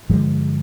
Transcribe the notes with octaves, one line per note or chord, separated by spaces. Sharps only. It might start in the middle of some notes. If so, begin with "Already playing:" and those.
G2 D3 F3 G#3